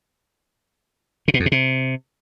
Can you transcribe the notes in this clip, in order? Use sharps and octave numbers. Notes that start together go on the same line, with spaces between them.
C#3
B2
F2
B2
C3